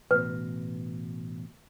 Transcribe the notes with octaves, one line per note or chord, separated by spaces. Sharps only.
A1 B2 B4